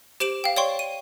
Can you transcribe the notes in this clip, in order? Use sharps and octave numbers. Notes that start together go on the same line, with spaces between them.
G4 C5 D7 E7 F#7
F5 G5
C#5 D5 G5 C6 C#6
D#7